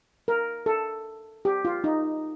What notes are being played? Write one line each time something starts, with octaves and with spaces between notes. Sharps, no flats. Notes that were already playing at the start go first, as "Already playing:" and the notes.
A#4
A4
G4
F4
D#4